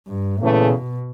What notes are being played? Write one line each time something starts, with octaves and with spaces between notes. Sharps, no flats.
G2
E2 A#2 C#3 E3 A3
B2